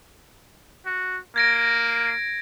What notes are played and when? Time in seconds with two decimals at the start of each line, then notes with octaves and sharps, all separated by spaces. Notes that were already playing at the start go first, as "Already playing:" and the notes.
0.86 F#4
1.36 A#3 G#6 A#6 D7